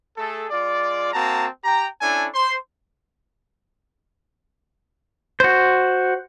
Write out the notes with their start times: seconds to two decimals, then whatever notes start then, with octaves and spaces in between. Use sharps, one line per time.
0.18 A3 G#4 A4
0.50 G#3 F4 D5
1.13 A#3 C4 F#4 A5 A#5
1.64 G4 G5 A#5
2.01 C#4 D4 E4 A4 G#5
2.34 C5 C6
5.40 F#4 C5